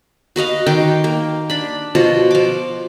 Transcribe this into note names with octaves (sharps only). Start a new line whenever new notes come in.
F#4 B4 D#5 F5
D#3 G5 C6 D6
A#3
D4 B5
B2 F3 F4 F#4
F3 D6